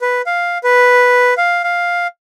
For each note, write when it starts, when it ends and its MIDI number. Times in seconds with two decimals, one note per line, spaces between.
0.01 0.22 71
0.26 0.58 77
0.64 1.34 71
1.37 1.63 77
1.64 2.07 77